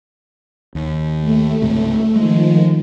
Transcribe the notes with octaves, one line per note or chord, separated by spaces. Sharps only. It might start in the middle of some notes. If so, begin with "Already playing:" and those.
D#2
A3
C#2 G#2 C3
D#3 F3 G#3